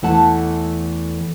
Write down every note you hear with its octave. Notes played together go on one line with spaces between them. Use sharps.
E2 E3 A3 F#5 A5